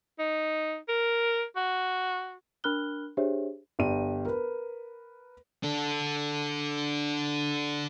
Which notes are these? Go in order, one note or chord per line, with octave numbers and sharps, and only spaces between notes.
D#4
A#4
F#4
D4 A#4 B5 F6 F#6 G7
D4 G4 G#4 C5 C#5 E5
G1 G4 D5 D#7
A#4 B4
D4 A4